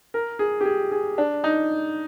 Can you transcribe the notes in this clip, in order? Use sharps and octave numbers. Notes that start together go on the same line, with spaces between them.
A#4
G#4
G4
G#4
G#4
D4
D#4